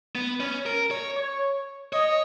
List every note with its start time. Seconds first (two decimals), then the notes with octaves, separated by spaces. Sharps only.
0.15 B3
0.40 C#4
0.66 A#4
0.91 C#5
1.16 C#5
1.92 C#5 D#5